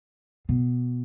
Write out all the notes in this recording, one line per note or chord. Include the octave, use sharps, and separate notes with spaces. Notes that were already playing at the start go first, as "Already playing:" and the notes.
B2